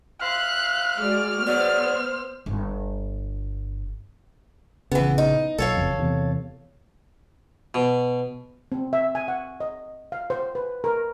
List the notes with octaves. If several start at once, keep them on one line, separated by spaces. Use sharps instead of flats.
C5 E5 F5 F#6
G#3 F#4 D5 F6
G#2 B2 F#3 B3 C5 D5
G1
A#1 C#3 E3 B3
D#4
B1 A4 C#5 F5
F#1 F2
E2 C3
B2
C4
E5
G#5
F#5
D#5
F5
C5
B4
A#4